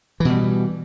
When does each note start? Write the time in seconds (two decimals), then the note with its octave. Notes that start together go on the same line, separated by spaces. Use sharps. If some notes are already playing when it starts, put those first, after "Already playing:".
0.20 E3
0.25 B2
0.30 G3